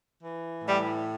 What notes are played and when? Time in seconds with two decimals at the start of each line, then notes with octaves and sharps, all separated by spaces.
0.21 E3
0.64 A2 G3